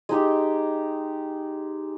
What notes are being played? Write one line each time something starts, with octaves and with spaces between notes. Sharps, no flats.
G#3 D#4 G4